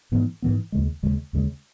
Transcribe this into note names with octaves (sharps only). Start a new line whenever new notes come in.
G#2 E3 B3
G#2 E3 B3
D#2 C#3 G#3
D#2 C#3 G#3
D#2 C#3 G#3